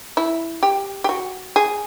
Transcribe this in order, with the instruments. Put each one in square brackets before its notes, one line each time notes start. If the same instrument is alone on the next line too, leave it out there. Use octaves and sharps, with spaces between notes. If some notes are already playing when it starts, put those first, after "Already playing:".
[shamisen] E4
G4
G4
F#4
G#4